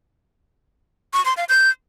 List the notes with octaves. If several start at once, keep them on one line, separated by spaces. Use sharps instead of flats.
C#6
C6
F5
G6